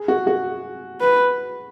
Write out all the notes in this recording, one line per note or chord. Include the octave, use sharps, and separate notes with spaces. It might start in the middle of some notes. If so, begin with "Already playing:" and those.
Already playing: G#4
F#4
F#4
B4